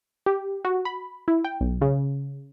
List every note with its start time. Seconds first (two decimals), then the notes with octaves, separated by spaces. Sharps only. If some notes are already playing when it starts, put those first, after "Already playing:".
0.26 G4
0.65 F#4
0.85 B5
1.28 E4
1.44 G5
1.61 B1
1.81 C#3